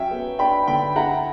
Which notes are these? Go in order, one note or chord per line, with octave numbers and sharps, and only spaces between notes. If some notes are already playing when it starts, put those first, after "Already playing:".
Already playing: F#3 C#4 E5 G5
B3
D4 G5 B5
D3 G5 B5
E4 F#5 A#5